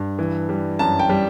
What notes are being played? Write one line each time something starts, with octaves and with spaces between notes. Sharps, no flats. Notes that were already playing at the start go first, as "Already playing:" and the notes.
Already playing: G2
E3
G3
F#2 A5
G5
G3